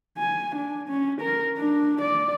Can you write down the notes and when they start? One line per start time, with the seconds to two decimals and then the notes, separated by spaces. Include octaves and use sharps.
0.18 G#5
0.55 D4
0.88 C#4
1.21 A#4
1.57 D4
2.01 D5